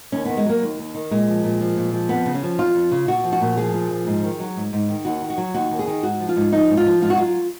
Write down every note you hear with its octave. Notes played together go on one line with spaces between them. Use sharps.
D#2 C#4
D#3 B3
G#3
F#3 A#3
D#2
D#2
D#3
A#2 G#3
F3
A#2
F3
A#2
F3
F2 B3
C#3
C#4
F3
F2 F4
F2
C#3
A#2 F#4
F3
F#4
A#2
F3 G#4
A#2
F3
G#2
D#3
F#3
G#2
G#2
D#3
D#2 F#4
D#3
F#4
F#3
D#2 F#4
D#2
G#4
D#3
G#2 F#4
F3
F4
G#2
F3 D#4
G#2
F4
F3
G#2 F4
F#4
F#3 F4